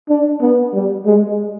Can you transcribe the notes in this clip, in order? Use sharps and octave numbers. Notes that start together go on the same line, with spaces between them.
D4
B3
G3
G#3